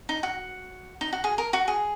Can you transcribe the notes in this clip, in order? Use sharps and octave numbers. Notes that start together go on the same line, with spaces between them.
D#4
F#4
D#4
F#4
G#4
A#4
F#4
G#4